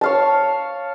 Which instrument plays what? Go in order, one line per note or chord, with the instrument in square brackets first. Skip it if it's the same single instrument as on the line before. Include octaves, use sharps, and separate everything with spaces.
[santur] C#5 F5 A5